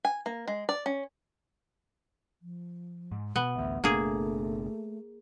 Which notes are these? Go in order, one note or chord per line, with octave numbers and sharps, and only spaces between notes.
G#5
A#3
G#3
D5
C#4
F3
G#2
B2 B3
A1 D2 E5
F#1 B2 A3 A#3 D4 G#4